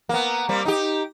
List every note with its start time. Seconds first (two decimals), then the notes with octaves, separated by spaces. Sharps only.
0.09 A#3 B3
0.49 G3 A#3 C4
0.65 D#4 G4